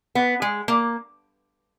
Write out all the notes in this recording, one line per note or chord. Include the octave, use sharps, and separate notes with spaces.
B3
G#3
A#3